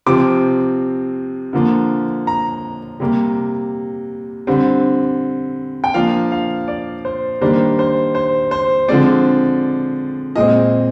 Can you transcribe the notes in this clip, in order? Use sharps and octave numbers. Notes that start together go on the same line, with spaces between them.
C3 F3 C4 D6
D3 F3 A#3
A#5
C3 G3 A#3
D3 G3 C4
G5
F3 A#3 D4 F5
F5
D5
C5
D#3 G3 A#3 D4 C5
C5
C5
C5
D3 F3 G#3 C4 D5
A#2 G#3 C4 D#5